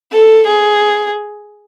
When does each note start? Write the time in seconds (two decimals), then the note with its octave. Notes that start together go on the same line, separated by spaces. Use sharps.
0.12 A4
0.47 G#4